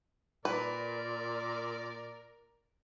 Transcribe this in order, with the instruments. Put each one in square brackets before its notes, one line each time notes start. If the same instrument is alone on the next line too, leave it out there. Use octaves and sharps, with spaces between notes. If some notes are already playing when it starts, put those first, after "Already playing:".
[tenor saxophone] A#2 [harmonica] A#4 D5 [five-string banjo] B4